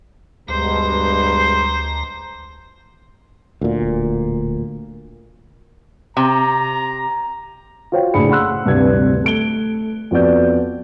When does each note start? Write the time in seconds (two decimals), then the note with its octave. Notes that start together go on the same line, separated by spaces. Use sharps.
0.48 D2 G2 B2 G#3 C5 A#5
3.61 D2 A#2
3.82 D1
6.17 C3 A#5
7.92 F4 F#4 C5 C#5 G5
8.14 F#1 A2 D4 G#4 B5 C#7
8.30 F#5 B5 C6 E6 F#6
8.65 D1 G2 C3 G3 B4 G#6
9.24 A3 D7 G7
10.11 F2 F3 B3 F#4 D5 G6